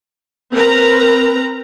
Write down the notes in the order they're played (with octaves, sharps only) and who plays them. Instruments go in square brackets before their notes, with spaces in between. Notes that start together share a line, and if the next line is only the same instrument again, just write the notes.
[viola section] C4 A#4 B4 A#5